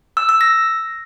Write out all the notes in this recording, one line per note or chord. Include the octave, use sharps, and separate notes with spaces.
E6
E6
A#6